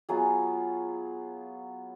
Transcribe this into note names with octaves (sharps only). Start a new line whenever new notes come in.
F#3 B3 F4 G#4